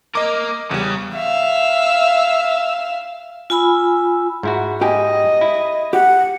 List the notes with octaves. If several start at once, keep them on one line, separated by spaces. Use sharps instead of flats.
A#3 A#4 D#5 D6
E2 C#3 G3
E5 F5
F4 G#5 B5 E6
G#2 E4 F#4
G4 D#5 G5 G#5
E4
G4 F#5